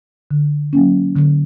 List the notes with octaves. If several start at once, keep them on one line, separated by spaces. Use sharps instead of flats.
D3
F#3 A#3 C#4
D3